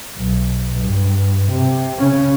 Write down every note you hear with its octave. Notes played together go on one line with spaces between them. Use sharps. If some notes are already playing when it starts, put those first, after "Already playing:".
B1
G2
C3
C#3 C#4